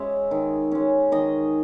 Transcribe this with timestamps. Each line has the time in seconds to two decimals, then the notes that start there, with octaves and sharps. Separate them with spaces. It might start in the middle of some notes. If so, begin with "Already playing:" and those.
Already playing: G#3 C#4 E5
0.31 D#3
0.72 G#3 C#4
1.12 D#3 D#5